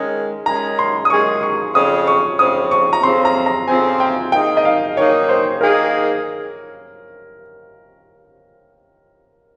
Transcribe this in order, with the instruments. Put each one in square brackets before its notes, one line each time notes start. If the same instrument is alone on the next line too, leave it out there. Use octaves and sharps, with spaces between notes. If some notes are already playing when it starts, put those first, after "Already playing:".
Already playing: [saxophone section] D#3 G#3 C#4 G#4
[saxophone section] D#3 G#3 C#4 G#4 [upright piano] A#5
[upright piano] C6
D#6
[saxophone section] D#3 G#3 C#4 G#4 [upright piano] C#6
[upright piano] C#6
[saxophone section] F2 C#3 F3 C4 [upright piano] D#6
[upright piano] C#6
[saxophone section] F2 C#3 F3 C4 [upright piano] D#6
[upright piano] C#6
A#5
[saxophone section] F2 C#3 F3 C4 [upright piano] C6
[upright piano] A#5
A#5
[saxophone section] F2 C#3 F3 C4 [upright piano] G#5
[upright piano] G5
[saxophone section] D#3 A#3 D#4 G#4 [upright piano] G5
[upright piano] D#5
F5
[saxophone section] D#3 A#3 D#4 G#4 [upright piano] C#5
[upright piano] C5
[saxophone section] D#3 A#3 D#4 G#4 [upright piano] A#4